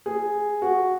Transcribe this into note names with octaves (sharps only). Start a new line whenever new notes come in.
G#4
F#4